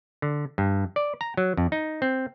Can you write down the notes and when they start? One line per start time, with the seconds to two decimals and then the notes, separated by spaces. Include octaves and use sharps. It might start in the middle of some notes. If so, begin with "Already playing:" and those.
0.22 D3
0.58 G2
0.96 D5
1.21 A#5
1.37 F#3
1.57 F2
1.72 D#4
2.02 C4